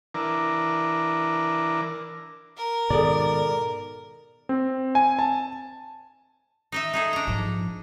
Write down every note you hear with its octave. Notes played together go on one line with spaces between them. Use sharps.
E3 D4 A#4
A#4
G#2 B2 D#3 D#4 G#4 A4 D5
C4
G#5
A5
D#4 D#5 E5
D#4 G#4 A4
D4 A#5
G#2 F3